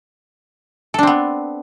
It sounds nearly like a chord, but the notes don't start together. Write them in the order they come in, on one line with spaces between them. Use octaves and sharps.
A4 D4 C4 B3